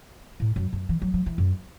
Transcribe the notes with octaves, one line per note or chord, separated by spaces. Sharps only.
A2
F#2
F#2
E3
F#3
F#3
E3
F#2